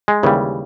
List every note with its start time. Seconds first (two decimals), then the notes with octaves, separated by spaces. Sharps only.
0.08 G#3
0.23 D#2 C#3 E3 G3